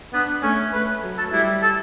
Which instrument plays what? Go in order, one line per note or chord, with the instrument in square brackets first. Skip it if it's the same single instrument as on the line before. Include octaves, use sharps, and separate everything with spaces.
[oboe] B3 [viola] D4
[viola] A3 [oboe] C#4
[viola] A3 [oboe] B4
[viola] F#3
[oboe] A4
[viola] G3 [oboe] E4
[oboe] A4